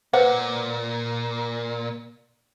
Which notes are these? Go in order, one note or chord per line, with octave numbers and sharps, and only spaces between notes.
A#2 B4 C5 F#5